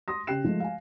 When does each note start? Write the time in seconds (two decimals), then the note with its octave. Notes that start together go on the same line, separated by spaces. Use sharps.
0.08 C6 D#6 A#6
0.27 C#3 G4 G5 F#6 C7 E7
0.44 F3 G#3 A3
0.60 F5 G#5